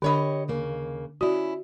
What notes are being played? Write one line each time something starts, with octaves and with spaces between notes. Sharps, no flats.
D3 D4 G4 C#5 D#5 B5
D#2 C#3 A#3
C#4 E4 F#4 D5